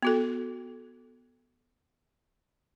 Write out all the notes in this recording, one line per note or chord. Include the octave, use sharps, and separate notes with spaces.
B3 F#4 A4